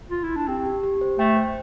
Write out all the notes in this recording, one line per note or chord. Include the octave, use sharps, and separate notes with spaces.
F4
E4
D4
C4 G4
G4
G4
C5
A3 G5
C5